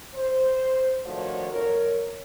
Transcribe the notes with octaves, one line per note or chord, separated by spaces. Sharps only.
C5
D#3 F3 A3 D4 F#4 C#5
F2 A#4 C#5